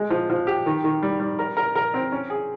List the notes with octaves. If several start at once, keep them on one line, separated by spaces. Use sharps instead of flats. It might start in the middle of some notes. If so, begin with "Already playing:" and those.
Already playing: G#3
F3
F3
G4
D#3
D#3
G3
G3
A#4
A#4
A#4
C4
C#4
G#4